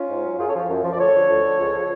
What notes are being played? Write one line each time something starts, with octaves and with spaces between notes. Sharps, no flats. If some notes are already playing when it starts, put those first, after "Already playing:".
Already playing: C#4 F4
G#2
F#3
F#2 F4 G#4
A4 C#5
F3
F#2
F3
D5
D2 A4 C#5
D3 F3
D2
D3 F3
C#2
C#3 F3